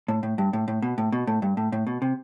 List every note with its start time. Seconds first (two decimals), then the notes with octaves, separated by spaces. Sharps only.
0.08 A2
0.23 A2
0.38 G2
0.53 A2
0.68 A2
0.82 B2
0.98 A2
1.12 B2
1.27 A2
1.42 G2
1.57 A2
1.72 A2
1.87 B2
2.02 C3